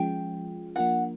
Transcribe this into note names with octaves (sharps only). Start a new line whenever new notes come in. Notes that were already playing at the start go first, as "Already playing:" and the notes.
Already playing: F3 G#3 C#4 F4 G#4 G5
F3 A#3 D4 F4 A#4 F#5